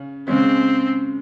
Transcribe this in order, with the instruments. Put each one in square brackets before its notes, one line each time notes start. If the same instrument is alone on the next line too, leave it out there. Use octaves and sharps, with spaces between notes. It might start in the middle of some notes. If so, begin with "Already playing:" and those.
Already playing: [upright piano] C#3 C#4
[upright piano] C#3 G#3 C#4 [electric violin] C4